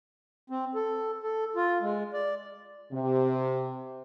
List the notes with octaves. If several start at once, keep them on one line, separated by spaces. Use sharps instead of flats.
C4
A4
A4
F4
G#3
D5
C3